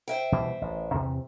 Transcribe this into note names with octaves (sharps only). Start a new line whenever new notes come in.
C5 E5 G5
B2 E3 G3
A1
E2 C3